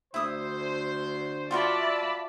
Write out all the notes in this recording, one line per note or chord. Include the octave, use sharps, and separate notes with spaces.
D2 E4 C5 D#6
F4 F#4 D5 E5 F5 A5 B5